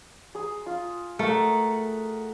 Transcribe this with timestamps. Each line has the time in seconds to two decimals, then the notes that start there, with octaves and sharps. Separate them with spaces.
0.35 G#4 C6
0.66 F4
1.19 A3 A#4 F#5